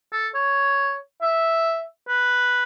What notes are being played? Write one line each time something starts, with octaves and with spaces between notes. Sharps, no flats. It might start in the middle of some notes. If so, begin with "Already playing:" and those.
A4
C#5
E5
B4